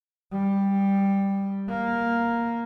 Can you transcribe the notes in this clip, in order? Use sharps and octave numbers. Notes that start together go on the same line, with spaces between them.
G3
A#3